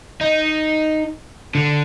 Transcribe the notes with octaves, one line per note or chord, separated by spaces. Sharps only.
D#4
D3